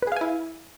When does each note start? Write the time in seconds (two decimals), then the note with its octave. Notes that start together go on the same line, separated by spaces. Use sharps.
0.03 B4
0.07 G#4
0.12 F5
0.16 G#5
0.21 E4